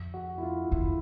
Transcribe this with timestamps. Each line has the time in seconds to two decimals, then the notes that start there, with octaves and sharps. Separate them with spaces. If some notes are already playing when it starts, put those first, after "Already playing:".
Already playing: F2
0.14 F#4
0.38 E4
0.43 F4
0.72 E2 E4